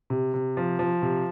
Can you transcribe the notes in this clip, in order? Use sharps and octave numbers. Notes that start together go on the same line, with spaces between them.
C3
C3
F3
F3
C3